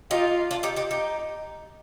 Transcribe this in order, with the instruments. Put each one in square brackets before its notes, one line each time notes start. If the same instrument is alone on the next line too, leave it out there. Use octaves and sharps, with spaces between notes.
[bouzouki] D#4 G4 [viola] F4
[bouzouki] D4 F4
D#4 G4
D#4 G4
D#4 G4